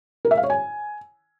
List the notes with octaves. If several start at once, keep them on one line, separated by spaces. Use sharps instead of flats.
A#4
E5
F5
C#5
G#5